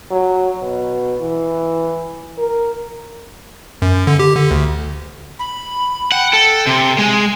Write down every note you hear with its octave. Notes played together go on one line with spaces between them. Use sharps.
F#3
B2
E3
A#4
F#2
D3
G4
D3
D2
B5
F#5 G5
A4
C3 C6
G#3 G#5